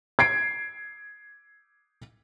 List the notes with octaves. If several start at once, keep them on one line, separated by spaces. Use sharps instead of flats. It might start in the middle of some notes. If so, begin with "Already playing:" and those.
G#6 C7 D7